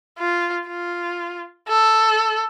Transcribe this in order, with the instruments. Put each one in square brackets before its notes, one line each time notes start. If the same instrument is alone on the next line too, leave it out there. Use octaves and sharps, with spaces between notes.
[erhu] F4
F4
A4